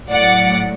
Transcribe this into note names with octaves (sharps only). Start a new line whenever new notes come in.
A2 F#3 D5 F#5